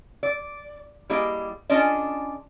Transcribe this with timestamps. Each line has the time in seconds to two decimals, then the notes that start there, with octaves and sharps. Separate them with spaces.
0.23 D5
1.10 G3 A#3 E4 G#4 D#5
1.70 C#4 D4 F4 G#4 D5 D#5